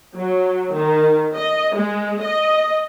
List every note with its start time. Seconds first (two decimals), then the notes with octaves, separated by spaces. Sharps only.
0.16 F#3
0.75 D#3
1.34 D#5
1.75 G#3
2.22 D#5